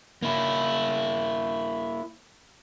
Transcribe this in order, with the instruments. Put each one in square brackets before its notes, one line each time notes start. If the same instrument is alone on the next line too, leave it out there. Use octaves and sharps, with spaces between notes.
[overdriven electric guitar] A#3 E4